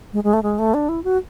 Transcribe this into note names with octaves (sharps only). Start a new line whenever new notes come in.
G#3
G#3
A3
G#3
A3
D4
E4
F#4